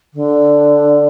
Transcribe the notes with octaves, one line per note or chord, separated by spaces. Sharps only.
D3